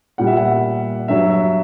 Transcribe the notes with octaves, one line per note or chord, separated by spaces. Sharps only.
A#2 G3 F#5
E5
F#5
G2 F#3 E5
E5